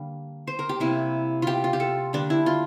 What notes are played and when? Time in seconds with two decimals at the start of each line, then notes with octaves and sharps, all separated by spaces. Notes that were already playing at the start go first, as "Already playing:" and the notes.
Already playing: D3 G3 A#3
0.47 C5
0.59 A#4
0.69 G4
0.80 C3 G3 A#3 E4
1.42 F4 G4
1.64 F4
1.73 G4
1.80 A4
2.13 D3 G3 A#3 D4
2.30 E4
2.46 F4